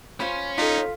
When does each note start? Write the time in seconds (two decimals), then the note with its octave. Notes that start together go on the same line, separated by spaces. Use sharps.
0.20 C#4 F4 C5 B5 C6
0.58 D#4 F4 A4 F5 B6